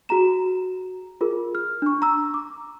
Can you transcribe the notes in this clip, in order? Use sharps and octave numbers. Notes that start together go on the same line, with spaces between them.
F#4 G#4 A#5 E7
F4 G#4 A#4
F6
D4 C#6
A#5 E6
D6